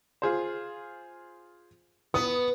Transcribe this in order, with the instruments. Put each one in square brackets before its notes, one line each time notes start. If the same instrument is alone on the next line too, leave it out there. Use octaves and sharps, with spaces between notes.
[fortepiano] F4 G#4 C5
[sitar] B3 [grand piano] D#6